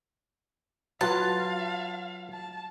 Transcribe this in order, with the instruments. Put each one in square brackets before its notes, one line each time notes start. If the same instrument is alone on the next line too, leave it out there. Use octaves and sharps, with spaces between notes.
[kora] F#3 [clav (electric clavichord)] F4 B4 [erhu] F5 [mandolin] A5
[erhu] A5